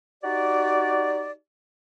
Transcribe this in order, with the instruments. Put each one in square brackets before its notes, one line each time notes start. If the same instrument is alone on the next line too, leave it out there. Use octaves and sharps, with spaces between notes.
[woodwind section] D#4 F#4 G4 D5